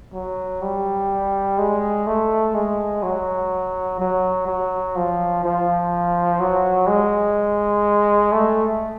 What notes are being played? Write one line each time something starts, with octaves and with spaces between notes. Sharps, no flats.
F#3
G3
G#3
A3
G#3
F#3
F#3
F#3
F3
F3
F#3
G#3
A3